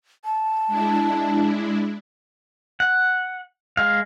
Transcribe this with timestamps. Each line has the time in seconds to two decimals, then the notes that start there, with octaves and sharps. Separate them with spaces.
0.25 A5
0.67 G#3 D4 E4
2.80 F#5
3.77 G#3 F5